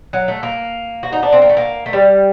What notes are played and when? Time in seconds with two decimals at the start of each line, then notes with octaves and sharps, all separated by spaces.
0.13 F#3
0.28 A3
0.43 A#3
1.03 F#4
1.13 D#4
1.23 D4
1.32 C4
1.42 A#3
1.49 A3
1.57 A#3
1.86 A3
1.93 G3